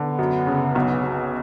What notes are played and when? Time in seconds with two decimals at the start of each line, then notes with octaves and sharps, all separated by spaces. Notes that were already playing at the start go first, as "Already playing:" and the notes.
Already playing: D3 B3
0.19 F#2
0.47 C#3
0.75 B1
1.03 B2